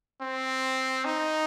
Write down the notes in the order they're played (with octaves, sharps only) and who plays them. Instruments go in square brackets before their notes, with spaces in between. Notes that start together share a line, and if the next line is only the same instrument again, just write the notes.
[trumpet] C4
D#4